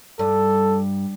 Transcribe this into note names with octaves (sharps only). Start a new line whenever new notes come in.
G2 A4